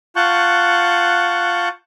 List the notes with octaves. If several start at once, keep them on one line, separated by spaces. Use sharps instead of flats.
F4 F#5 A5 C#6 F#6 G6